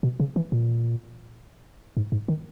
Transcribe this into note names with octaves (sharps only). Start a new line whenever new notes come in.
B2
C#3
E3
A#2
G#2
G#2
D#3